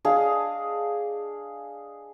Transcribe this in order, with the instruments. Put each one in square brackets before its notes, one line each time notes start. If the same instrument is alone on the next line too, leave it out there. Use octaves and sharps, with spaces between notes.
[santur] D4 G#4 D#5 F5